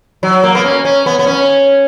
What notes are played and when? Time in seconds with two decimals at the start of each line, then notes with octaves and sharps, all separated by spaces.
0.23 F#3
0.44 A#3
0.55 B3
0.64 C#4
0.85 C#4
1.06 B3
1.19 B3
1.27 C#4